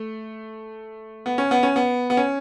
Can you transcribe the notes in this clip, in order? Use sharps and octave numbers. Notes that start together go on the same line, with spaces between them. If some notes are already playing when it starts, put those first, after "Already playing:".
Already playing: A3
B3
C#4
B3
C#4
B3
B3
C#4